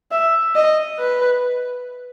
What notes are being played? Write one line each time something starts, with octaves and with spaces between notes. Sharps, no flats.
E5
D#5
B4